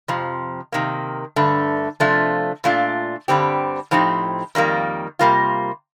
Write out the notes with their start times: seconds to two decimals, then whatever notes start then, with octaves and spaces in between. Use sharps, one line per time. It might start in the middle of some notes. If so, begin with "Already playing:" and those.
0.08 F2 C3 F3
0.72 C3 D#3 A#3
1.36 G2 D3 A3
2.00 C3 F3 A3 D4 F4
2.64 A#2 A3 D4 F4
3.28 G2 D3 G3 C4 G4
3.91 A2 F3 C4 D#4 G4
4.55 F2 D#3 G3 A#3
5.19 C3 G3 A#3 F4